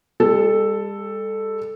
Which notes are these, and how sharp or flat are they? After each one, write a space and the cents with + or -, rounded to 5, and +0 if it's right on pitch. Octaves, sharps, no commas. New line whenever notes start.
G3 +45 A4 +0